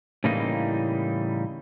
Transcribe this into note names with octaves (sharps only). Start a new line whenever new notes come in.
A2 C#3 E3 G3 A#3 D#4